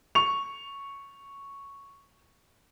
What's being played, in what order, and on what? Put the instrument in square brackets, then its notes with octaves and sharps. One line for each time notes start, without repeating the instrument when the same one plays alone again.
[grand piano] C#6 F7